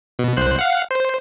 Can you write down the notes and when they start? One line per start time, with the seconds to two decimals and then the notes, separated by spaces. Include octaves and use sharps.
0.19 B2
0.37 C2 C5 F#6
0.59 F5 F#5
0.91 C5